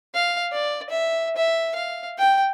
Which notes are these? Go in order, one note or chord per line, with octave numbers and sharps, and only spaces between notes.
F5
D5
E5
E5
F5
G5